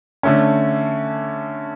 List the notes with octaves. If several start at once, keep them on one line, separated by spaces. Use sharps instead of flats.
D3 A3 C#4